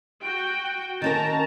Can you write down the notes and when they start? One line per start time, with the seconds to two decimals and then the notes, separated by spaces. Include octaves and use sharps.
0.23 F#4 G5
1.02 D#3 C#4 A#4 A5 A#5